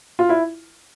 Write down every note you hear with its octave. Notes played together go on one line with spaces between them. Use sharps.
F4
E4